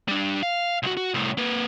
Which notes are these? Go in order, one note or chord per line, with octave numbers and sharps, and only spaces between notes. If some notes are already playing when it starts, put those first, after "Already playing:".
G3 D4
F5
C2 F#4
F#4
C2 A2
A#3 B4